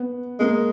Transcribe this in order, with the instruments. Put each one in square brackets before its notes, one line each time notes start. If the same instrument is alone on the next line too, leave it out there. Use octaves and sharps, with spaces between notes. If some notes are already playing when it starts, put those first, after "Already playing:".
Already playing: [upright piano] B3
[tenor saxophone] G#3 [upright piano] A#3